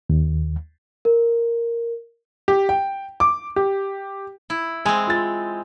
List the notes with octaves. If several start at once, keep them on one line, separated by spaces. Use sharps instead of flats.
D#2
A#4
G4
G5
D6
G4
E4
G#3 C4 G#5
F4 A6